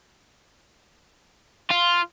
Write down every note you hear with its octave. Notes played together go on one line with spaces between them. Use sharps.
F4